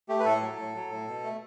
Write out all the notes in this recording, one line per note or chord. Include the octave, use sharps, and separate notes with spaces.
A3 G4
B4
A2 A4
F#3
A2
F#3
A2
B2
A3